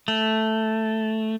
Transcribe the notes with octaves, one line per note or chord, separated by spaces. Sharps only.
A3